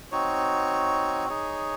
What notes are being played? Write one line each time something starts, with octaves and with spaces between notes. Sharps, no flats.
C4 D#4 F#4 C#5
D#4 G#4 C#5